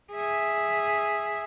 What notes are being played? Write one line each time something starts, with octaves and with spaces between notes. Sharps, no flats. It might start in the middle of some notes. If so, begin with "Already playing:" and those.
G#4 E5